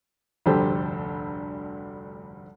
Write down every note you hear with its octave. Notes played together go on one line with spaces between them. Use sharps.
F1 D2 G2 G4 A4 C5